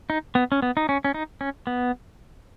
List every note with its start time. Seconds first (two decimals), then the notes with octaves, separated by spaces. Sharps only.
0.10 D#4
0.35 B3
0.52 C#4
0.62 B3
0.77 D#4
0.89 C#4
1.05 C#4
1.14 D#4
1.41 C#4
1.67 B3